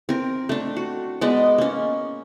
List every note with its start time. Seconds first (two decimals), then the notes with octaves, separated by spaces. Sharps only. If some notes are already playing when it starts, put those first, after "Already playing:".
0.09 C4 A#4
0.49 A3 D4
0.76 F#4
1.21 G#3 B3 D5 D#5
1.58 A#3 C#4